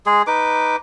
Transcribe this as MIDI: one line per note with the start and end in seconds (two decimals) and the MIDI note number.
0.06 0.22 56
0.06 0.22 68
0.27 0.76 63
0.27 0.76 71
0.27 0.76 86